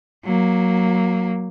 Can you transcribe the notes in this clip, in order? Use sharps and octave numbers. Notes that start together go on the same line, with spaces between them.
F#3 A#3